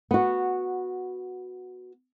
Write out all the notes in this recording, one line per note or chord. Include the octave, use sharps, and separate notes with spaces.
B3 F#4